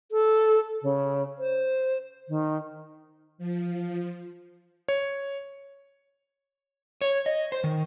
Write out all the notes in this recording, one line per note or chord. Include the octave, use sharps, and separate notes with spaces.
A4
C#3
C5
D#3
F3
C#5
C#5
D#5
C5
D#3